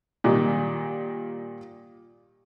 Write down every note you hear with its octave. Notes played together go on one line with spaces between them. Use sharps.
A#2 D#3 G3